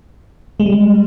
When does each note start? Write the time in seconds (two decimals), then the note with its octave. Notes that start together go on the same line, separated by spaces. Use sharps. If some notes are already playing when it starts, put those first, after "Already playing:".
0.60 G#3
0.66 G3